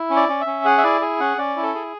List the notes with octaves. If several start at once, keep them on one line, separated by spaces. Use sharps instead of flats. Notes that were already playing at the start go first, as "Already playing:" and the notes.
Already playing: E4
C#4
D5
C#4
E5
C#4
G#4 F#5
E5
E4 D5
G#4
C#4 F#5
C#4 D5
E4
A4
G#4